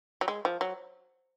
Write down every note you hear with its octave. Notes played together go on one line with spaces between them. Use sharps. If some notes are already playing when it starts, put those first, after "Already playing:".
F#3
G#3
F3
F#3